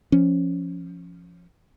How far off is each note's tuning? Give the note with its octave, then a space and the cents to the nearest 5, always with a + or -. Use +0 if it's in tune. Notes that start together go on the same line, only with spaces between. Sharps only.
F3 -5 C#4 +0